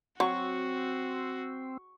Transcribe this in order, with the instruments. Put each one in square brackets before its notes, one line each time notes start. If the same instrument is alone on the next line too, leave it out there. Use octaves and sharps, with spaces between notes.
[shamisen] F#3 [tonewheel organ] C4 [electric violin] F#4 [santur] C#6